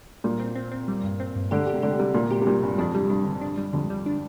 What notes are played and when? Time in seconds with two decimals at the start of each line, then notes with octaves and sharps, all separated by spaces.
0.24 A#2 G3
0.39 C4
0.55 C4
0.72 C4
0.88 G3
1.04 G2
1.20 C4
1.36 G2
1.51 D3 G4
1.67 G4
1.74 C3
1.82 D3 G4
1.99 C3 G3
2.14 A#2 G3
2.30 C3 G4
2.41 C3
2.47 A#2 G3
2.63 G2 A#2
2.78 F2 D4
2.94 C3 G3
3.10 G2 D4
3.25 D3
3.41 D4
3.58 G3
3.73 F2 D3
3.90 G3
4.06 D4